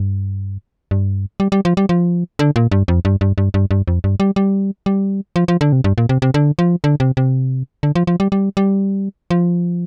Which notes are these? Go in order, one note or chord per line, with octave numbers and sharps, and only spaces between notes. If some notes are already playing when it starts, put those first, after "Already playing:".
Already playing: G2
G2
G3
G3
F3
G3
F3
D3
A#2
G2
F2
G2
G2
G2
G2
G2
F2
G2
G3
G3
G3
F3
F3
D3
C3
G2
A#2
C3
C3
D3
F3
D3
C3
C3
D3
F3
F3
G3
G3
G3
F3